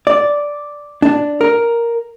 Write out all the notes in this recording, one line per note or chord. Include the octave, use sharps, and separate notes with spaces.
D5
D4
A#4